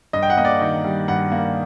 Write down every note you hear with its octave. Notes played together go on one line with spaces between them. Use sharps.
G2 D#5
G5
F#5
A#3 D#5
D5
D#3
G3
G2 F#5
A#3